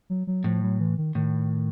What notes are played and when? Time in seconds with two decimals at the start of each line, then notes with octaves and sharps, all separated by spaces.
0.10 F#3
0.27 F#3
0.44 A2 F3
0.62 F#3
0.79 E3
0.98 D#3
1.15 A2 D#3